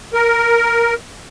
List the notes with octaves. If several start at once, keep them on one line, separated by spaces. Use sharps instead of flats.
A#4